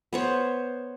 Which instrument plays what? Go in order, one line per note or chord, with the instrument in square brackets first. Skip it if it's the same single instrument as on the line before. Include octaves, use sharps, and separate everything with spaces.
[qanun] B3 C5 C#5